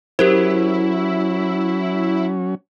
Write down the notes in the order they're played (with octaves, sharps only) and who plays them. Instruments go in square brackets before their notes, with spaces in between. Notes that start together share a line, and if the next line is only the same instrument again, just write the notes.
[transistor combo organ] F#3 C#4 [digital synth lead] E4 [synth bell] G4 A#4 C5